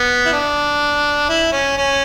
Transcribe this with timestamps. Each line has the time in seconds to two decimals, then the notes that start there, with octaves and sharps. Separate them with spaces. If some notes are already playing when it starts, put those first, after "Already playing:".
Already playing: B3
0.26 E4
0.33 D4
1.29 E4
1.52 C#4
1.78 C#4